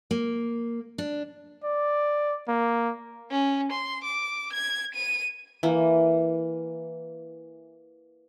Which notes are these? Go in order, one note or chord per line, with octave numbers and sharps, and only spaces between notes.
A#3
D4
D5
A#3
C#4
C6
D6
G#6
D#7
E3 A#3